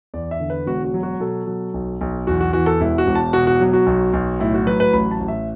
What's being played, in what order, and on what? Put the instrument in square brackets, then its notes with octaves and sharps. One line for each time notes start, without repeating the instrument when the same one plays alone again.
[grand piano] E2 D5
E5
D3
B4
E1 F#4
F#4
F#3
F#4
B2 A4
F#3
B1
B1
E2 F#4
F#4
E3 F#4
A4
E1 E4
F#4
E1
A5
B2 F#4
F#4
F#3
F#4
B1
B1
A2 E4
F#4
F#3 B4
B4
A1 B5
A5
A1
E5